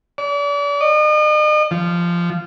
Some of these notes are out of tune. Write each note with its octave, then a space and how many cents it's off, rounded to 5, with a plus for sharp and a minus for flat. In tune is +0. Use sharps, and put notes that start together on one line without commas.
D5 -40
D#5 -40
F3 -15